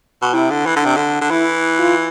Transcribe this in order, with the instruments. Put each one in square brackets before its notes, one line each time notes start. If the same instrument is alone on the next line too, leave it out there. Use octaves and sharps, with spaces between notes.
[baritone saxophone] B2
[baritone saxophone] C3 [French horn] E4
[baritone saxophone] D3
E3
D3
[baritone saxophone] C3 [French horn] D4
[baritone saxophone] D3
D3
[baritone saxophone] E3 [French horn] E4
[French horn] F4